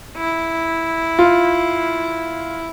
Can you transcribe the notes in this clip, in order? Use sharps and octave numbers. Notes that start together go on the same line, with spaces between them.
E4
F4